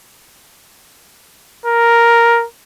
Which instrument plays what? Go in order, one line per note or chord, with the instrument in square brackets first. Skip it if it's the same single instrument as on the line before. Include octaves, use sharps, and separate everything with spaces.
[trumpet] A#4